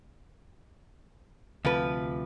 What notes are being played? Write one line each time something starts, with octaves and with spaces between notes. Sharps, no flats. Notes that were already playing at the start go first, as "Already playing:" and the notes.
D2 C3 F3 B4